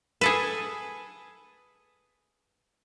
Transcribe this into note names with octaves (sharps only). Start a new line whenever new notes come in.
G#4 A4 B4